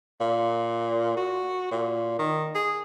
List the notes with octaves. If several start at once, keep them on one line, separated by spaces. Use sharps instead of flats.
A#2
F#4
A#2
D#3
G#4